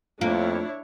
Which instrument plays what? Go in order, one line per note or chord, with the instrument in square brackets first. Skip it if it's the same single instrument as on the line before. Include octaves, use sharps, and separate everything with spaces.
[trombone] F2 [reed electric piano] A3 F4 [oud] A#3 [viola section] D4 E4 C#5